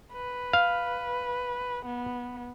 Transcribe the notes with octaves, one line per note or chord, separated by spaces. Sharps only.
B4
F5
B3